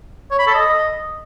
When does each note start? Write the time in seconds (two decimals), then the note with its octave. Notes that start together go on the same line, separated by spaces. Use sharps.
0.31 C#5
0.39 B5
0.47 A4
0.55 D#5